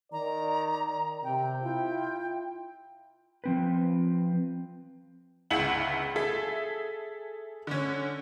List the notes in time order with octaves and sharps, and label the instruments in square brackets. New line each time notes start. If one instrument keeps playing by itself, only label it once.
[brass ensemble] D#3 D5 [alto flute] A#5
[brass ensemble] C3 [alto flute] G5
[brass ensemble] E4 F4 [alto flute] G5
[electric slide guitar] F3 C4 B4
[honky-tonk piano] G1 C#2 E4 E5 F#5 F#7
G#4 A4 E5
D3 C#4